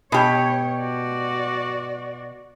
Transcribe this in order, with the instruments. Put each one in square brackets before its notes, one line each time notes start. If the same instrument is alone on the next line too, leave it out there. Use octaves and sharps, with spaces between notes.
[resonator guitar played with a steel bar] B2 G4 [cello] C#5
[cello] F#4 D5